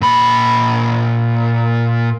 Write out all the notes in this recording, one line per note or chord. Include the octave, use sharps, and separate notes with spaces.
A#2 B5